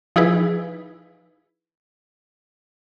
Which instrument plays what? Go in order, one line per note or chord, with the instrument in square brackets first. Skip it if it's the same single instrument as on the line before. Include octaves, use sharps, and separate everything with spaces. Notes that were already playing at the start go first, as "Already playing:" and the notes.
[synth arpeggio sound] F3 D#4 E4 G#4 B4